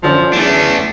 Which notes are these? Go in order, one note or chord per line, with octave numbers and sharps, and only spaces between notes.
F#2 D3 F3 C#4
E2 A3 D4